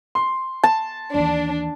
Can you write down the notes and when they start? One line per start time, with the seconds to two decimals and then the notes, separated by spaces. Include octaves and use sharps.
0.15 C6
0.64 A5
1.14 D#2 E3 D4